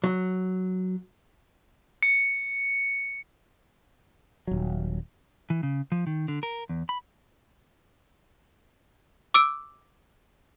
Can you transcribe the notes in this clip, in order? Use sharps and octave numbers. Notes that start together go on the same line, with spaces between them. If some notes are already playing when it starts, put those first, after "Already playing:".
F#3
C#7
D#1 F#3
E3
C#3
F3
D#3
D3
A#4
E2
B5
D6 E6 D7